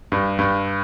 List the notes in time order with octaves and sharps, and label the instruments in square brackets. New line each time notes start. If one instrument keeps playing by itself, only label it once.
[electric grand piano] G2
G2